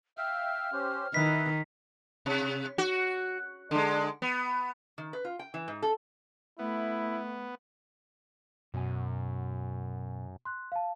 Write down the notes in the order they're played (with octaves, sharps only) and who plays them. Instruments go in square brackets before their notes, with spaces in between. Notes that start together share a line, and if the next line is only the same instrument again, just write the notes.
[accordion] E5 F5 G5 [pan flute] F6
[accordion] C#4 G4 C5
[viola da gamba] D#3 [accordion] E4 B4 D#5 [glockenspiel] B6
[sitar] C3
F#4
D3 G#3
B3
[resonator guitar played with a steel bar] D#3
B4
F4
G5
E3
G#2
A4
[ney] A3 [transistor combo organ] B3 [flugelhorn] E4
[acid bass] F#2 [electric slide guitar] B2 G#5
[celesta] C6 F#6
F5 A5